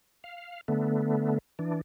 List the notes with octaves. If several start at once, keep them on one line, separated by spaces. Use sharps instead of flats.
F5
D3 A3 B3
E3 D4